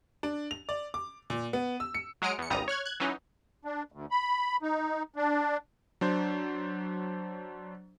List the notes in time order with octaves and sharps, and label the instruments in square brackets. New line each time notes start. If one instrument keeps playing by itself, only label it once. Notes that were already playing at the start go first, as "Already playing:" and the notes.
[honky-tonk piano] D4
F7
D5
D6
A#2
B3
E6
C#7
[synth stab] F#3 G#3 D#6 F6 C#7 D7
E2 C#7
G#1 C#2 G3 A#5 D#6
C#5 F6 F#6 G#6
F#6 G#6
E3 F#3 C#4 D#4
[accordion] D4
D2
B5
D#4
D4
[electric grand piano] F#3 D4 C5